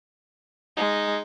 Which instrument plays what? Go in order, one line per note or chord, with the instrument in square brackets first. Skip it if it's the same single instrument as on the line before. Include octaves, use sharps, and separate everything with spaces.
[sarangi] G#3 [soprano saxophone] D#4